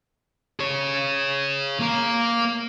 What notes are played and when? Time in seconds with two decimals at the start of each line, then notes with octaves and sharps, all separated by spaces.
0.60 G#4 C#5
1.80 A#3 A#4